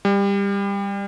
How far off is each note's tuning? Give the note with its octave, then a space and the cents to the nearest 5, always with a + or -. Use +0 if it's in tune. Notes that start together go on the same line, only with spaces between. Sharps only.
G3 +25